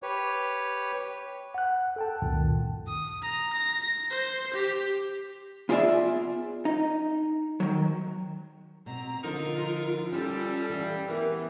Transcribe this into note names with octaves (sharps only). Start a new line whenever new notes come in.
G4 B4 C#5
F#5 F#6
A4 G5 A5
C#2 F#2 A#2 D#3
D#6
A#5
A#6
C5
G4
B3 F4 G#4 A4 D5 E5
D#4
D#3 F#3
B2 C4 A#5
D3 F3 D#4 F4 A#4
G3 C#4 F4 A4
E3 F5
E3 B3 G4 A#4